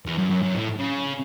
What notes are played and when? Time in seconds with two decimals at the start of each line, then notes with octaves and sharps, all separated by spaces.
0.06 E2
0.18 F#2
0.30 F#2
0.43 F#2
0.55 A2
0.79 C#3